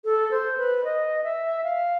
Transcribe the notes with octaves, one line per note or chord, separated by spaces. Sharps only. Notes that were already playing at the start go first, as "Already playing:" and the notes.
A4
C5
B4
D#5
E5
F5